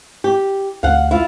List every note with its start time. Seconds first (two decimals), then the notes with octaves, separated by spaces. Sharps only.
0.24 G4
0.83 D2 F5 F#5
1.11 E4 F4